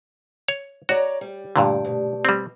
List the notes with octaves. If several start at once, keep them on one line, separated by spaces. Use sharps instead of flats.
C#5
F#4 C#5 D5 A#5
G3
G2 A#2 D3 A3 G4 D5
B2
G3 C4